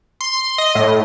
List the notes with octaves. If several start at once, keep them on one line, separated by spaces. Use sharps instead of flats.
C6
D#5
A2